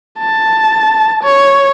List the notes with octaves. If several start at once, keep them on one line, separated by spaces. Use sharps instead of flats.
A5
C#5